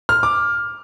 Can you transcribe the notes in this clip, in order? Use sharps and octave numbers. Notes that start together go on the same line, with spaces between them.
F6
D6